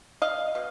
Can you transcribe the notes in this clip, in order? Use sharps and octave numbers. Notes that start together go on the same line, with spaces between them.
D#5 F5
B2